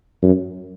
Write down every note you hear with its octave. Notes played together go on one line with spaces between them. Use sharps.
F#2